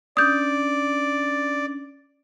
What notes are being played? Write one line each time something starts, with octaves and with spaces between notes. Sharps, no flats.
C#4 D4 D5 D#6 G6